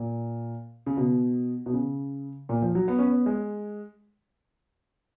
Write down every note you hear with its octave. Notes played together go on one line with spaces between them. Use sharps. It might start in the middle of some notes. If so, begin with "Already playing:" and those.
Already playing: A#2
C#3
B2
B2
C#3
A#2
F3
F#3
B3
C#4
B3
G#3